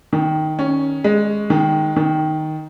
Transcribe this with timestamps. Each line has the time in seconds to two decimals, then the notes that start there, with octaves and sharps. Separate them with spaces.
0.13 D#3
0.59 C#4
1.04 G#3
1.50 D#3
1.96 D#3